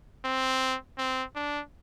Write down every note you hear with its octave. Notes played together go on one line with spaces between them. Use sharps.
C4
C4
D4